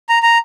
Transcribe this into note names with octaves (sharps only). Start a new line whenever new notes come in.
A#5
A#5